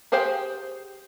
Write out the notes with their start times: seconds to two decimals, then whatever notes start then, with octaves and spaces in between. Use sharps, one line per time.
0.12 G4 G#4 C5 F5 G5